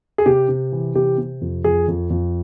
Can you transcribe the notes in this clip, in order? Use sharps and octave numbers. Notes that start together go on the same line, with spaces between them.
G#4
C3 G4
C3
E3
C3 G4
C3
F2
F2 G#4
F2
F2